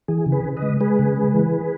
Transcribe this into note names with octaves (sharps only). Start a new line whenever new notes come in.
E3 G#4
C#3
G#4 B4
C#3
B4 D#5
G#3
G#3 G#4 B4
C#3
G#3
E3